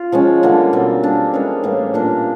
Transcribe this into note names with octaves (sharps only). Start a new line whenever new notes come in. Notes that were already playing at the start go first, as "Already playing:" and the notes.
Already playing: F4
F3 G#3 C#4
D3 G3 A#3
B2 G3 C4
G3 A#3 D4
E3 G#3 C#4
A2 E3 G3 A#3
A#2 G3 A#3 D4